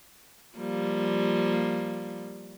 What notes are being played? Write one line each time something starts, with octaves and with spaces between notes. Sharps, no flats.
F3 G3 A#3